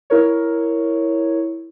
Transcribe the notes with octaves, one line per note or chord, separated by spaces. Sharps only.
E4 A#4 C#5